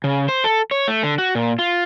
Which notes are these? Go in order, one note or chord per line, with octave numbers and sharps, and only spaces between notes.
C#3
C5
A4
C#5
A3
D3
F#4
A#2
F4